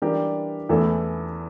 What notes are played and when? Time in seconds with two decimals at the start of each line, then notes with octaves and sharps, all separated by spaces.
0.02 E3 G3 D4 G4 A#4
0.69 E2 E3 A3 E4 A4